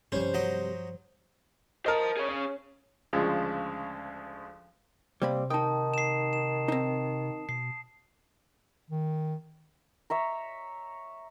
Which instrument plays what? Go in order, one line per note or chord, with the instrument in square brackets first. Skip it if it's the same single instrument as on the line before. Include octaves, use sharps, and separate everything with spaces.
[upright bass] G2 F3 [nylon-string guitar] C3 G3 B4 [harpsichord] C#4 [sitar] C5
[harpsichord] F#3 D#5
[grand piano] A#4 D#5 [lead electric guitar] C5 A5
[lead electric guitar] G#4 C#5
[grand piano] C#4
[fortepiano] D2 C#3 F3 G#3
[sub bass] C3 [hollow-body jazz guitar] G3 A#3 B5 [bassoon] C4
[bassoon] D#3 [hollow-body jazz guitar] D#4 G5 [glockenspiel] A5 D#6
[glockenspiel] C7 E7
E7
[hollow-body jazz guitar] C4 D#4
[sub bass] B2 [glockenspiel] C7
[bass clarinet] D#3
[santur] C#5 E5 A#5